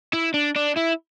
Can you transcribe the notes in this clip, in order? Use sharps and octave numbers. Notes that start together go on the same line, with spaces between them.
E4
D4
D4
E4